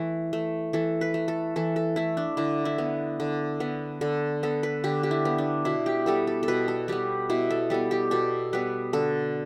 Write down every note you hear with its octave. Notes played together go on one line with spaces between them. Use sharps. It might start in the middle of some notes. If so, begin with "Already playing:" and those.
Already playing: E3 A3
A3
E3 A4
B4
A3
A4
E3 A4
A4
A3 E4
D4
D3 E4
E4
B3
D3
B3
D3 A4
B3 A4
B4
D3 G4
G4
E4
B3
D4
B2 E4
G4
G3 B3 A4
A4
A4
B2 B4
A4
G3 B3 G4
B2 E4
A4
G3 B3 A4
G4
B2 A4
G3 B3 B4
D3 A4